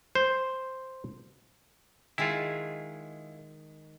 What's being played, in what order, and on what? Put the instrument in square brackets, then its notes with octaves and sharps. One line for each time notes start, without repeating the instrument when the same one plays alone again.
[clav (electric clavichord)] C5
[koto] D#3 G#3 G#4 [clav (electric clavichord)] E4 F4